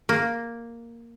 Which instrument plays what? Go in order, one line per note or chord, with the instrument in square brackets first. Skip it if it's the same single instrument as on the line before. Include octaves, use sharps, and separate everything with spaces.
[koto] A#3